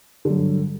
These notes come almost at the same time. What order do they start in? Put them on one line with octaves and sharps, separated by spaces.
D3 F#3 G2